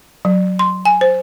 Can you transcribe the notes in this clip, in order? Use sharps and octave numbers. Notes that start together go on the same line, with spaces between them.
F#3
C6
G#5
C5